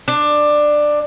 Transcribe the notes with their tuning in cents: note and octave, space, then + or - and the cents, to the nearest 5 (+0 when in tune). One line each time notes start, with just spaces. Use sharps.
D4 +15